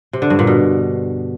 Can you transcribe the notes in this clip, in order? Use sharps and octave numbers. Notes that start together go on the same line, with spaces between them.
C3
D3
G2
A#2
B2